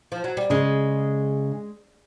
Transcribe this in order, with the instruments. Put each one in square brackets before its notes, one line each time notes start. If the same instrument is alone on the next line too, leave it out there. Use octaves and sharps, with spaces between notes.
[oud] F3
F#3
G3
[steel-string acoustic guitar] C#3 [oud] G#3